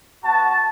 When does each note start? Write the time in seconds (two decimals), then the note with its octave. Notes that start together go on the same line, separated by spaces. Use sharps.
0.23 B3 F#4 A5